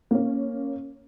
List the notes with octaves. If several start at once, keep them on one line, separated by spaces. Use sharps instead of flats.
A#3 C#4